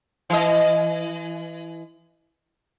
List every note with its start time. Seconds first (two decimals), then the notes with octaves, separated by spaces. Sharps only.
0.30 E3 D#5